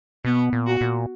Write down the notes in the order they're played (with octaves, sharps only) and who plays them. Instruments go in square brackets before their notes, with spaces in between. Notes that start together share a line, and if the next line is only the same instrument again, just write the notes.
[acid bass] B2 [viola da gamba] B3
[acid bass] A#2
[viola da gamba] F#4
[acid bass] A#2